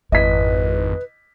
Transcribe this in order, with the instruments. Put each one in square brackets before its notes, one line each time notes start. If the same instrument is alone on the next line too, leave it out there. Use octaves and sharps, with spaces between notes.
[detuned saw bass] G#1 [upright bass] F2 E4 [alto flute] B4 [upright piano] D#5 B6